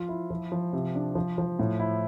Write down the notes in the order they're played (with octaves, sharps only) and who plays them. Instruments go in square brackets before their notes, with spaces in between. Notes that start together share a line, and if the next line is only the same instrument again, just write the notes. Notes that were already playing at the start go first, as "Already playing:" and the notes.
Already playing: [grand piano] F3 F4
E4
F3
F3
C3
D4
F3
F3
A2
E4